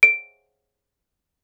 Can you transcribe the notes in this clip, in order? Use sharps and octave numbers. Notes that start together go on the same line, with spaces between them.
D7